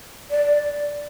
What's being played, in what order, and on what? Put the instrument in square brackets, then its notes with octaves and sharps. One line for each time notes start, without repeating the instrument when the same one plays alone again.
[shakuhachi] D5